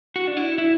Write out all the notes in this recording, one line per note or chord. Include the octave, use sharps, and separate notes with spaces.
F#4
D4
E4
E4